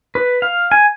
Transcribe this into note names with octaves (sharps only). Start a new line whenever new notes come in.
B4
F5
G#5